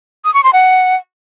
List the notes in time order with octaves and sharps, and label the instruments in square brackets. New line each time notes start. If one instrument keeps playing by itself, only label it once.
[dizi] D#6
C#6
C6
F#5